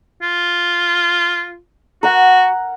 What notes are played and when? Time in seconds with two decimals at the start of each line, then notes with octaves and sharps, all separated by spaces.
0.22 F4
2.03 F#4 A#4 F#5